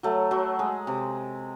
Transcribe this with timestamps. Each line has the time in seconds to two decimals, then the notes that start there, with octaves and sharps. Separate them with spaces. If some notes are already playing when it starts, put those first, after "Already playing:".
0.03 F#3 A3
0.31 F#3
0.59 G#3
0.87 C3